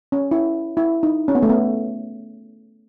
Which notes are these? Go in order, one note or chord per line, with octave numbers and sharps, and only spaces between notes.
C#4
E4
E4
D#4
C#4
B3
A3
B3